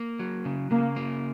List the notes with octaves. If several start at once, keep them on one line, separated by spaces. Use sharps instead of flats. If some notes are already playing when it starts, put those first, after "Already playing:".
Already playing: A#3
F#3
C#3
C#3 A#3
A#3